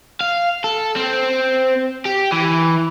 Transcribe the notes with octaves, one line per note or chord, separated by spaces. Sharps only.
F5
A4
C4
G4
E3